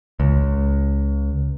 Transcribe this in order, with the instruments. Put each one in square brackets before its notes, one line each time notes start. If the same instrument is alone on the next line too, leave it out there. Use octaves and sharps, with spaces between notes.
[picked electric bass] C#2